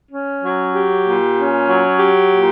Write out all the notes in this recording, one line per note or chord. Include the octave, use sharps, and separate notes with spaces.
C#4
F#3
G4
A#2
C#4
F#3
G4
A#2